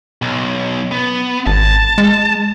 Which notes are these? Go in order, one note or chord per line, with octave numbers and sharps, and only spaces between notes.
B1
B3
G#1 A5
G#3